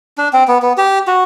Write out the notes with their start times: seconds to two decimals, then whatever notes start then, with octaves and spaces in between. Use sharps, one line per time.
0.18 D4
0.33 C4
0.48 B3
0.63 B3
0.78 G4
1.07 F#4